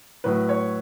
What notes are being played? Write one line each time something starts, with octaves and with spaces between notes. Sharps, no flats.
A2 F#3 B4
C#5